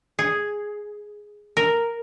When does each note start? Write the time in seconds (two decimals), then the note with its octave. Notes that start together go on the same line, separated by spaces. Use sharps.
0.19 G#4
1.57 A#4